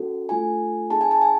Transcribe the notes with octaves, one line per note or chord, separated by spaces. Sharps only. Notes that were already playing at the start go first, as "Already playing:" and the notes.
Already playing: C#4 F#4 A4
A3 D4 F4 A4 G#5
C4 D#4 G#4 A5
G#5
A5
G#5